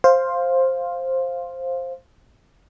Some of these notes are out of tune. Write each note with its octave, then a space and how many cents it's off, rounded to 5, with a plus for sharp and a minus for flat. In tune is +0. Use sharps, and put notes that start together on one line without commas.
C5 +10 F5 +0